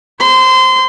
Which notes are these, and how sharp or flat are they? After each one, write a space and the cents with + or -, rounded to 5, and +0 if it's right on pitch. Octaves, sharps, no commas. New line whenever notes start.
C5 +15 C6 -25